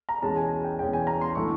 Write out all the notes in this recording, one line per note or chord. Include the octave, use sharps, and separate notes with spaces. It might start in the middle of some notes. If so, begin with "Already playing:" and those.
A#5
E2 B2 G#3 C#4 A5
G#5
G5
E2 B2 G#3 C#4 G5
G#5
A#5
C6
A2 F#3 A3 D4 C#6